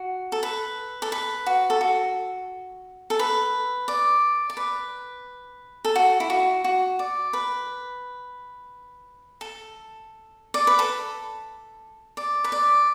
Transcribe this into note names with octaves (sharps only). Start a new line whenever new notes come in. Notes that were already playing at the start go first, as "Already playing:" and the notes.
Already playing: F#4
A4
B4
A4
B4
F#4
A4
F#4
A4
B4
D5
D5
B4
A4
F#4
E4
F#4
F#4
D5
B4
A4
D5
B4
A4
D5
B4
D5